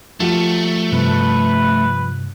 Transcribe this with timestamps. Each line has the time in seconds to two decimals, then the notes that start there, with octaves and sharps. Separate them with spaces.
0.20 F3 A3 F#4 G4
0.92 G2 C3 B4